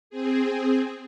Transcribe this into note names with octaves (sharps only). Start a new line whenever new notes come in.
C4 G#4